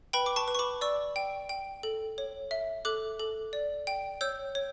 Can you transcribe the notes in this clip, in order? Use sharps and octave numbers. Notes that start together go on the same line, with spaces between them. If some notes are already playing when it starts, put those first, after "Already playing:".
B4 G5 B5
D6
A5 C#6
B4
C#6
B5 D6
D5 C#6 E6
G5
G5
A4
C#5
E5
A4 D6 F#6
A4
D5
G5
C#5 E6 G6
C#5